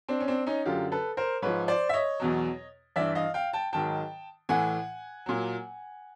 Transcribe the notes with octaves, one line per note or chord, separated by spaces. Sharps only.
C4 D4
C#4
C4 D4
C#4 D#4
F#2 D3 F#3 F4 G4
A4 B4
A#4 C5
G#2 F3 B4 C#5
C5 D5
E5
C#5 D#5
E2 B2 F#3
G2 E3 D5 E5
D#5 F5
F5 G5
G5 A5
G#2 D#3 F#3 G5 A5
A2 E3 F#5 G#5
A#2 F#3